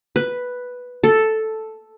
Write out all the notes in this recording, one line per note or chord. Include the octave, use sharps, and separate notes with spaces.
B4
A4